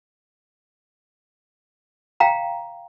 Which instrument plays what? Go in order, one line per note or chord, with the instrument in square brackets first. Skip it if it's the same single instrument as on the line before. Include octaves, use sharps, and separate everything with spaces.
[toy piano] F5 G5 A#5